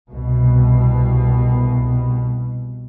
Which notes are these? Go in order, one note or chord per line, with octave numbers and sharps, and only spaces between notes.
C2 B2